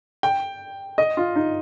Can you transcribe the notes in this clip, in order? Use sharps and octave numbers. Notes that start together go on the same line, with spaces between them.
G5
D#5
F4
D#4